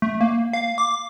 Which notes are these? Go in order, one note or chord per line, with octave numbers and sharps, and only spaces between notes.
A3
A#3
F5
D6